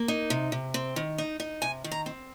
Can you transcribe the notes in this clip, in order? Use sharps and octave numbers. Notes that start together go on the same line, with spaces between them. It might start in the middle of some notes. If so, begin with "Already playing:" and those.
Already playing: A#3
D#4
C3
C3
C4
D#3
D#4
D#4
C3 G#5
D#3
A#5
C4